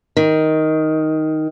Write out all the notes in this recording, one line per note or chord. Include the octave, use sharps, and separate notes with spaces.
D#3